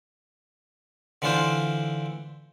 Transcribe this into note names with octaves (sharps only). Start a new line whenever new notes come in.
D3 E3 D4 F4 C5